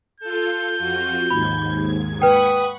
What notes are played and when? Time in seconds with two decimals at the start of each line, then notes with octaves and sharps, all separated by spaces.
0.20 F4 A4 G6
0.79 F2 F4 F#4
1.30 D#2 G#2 B5 G#6
2.22 B4 F#5 G5 B5 C#6 D#6